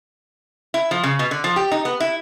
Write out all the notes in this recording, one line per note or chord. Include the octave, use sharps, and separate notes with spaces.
E4
F3
C#3
B2
D3
F3
G4
D#4
B3
E4